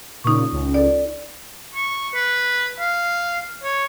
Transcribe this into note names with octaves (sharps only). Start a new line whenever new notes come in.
A#2 C#3 D#4 C#6
C#2
A4 D5
C#6
B4
F5
C#5